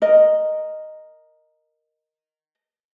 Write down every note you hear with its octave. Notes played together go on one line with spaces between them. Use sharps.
A#4 D#5